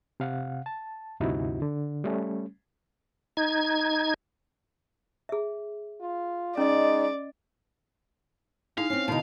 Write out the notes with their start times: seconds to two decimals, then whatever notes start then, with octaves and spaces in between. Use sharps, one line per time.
0.20 C3 F5 F#5
0.66 A5
1.20 D2 G2 C3 D#4 E4 F#4
1.62 D3
2.04 G3 A3 C#4
3.37 D#4 G#6
5.29 G#4 E5
6.01 F4
6.57 G#3 C#4 D#4 D5 D#5
8.78 D#4 E4 G#4 F5
8.90 C4 C#4
9.08 B2 D3 D#4 E4 A5